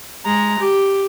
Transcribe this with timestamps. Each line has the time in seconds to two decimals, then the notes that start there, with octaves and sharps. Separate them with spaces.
0.25 G#3 A#5
0.59 G4